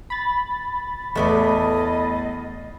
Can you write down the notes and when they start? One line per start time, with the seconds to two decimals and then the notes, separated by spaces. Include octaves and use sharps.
0.10 B5 A6
1.15 E2 A2 A3 B3 D5 D#5